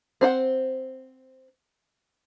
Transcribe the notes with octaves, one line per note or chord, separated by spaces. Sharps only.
C4 C5 F#5